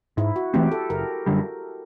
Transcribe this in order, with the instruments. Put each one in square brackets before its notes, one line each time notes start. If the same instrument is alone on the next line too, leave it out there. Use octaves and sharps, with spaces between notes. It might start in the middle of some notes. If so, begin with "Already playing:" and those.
[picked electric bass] G#2 [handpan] E4
[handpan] F#4
[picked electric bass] E3 A3 C4 [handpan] G4
[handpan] A4
[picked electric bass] F#1 [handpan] A#4
[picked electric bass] F#2 D3 G3